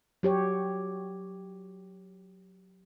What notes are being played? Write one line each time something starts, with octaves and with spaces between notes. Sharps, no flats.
F#3 G4 C#5